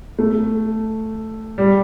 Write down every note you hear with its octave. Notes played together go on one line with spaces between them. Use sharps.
A3
G3